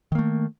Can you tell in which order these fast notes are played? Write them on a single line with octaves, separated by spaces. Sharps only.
D#3 A#3 A3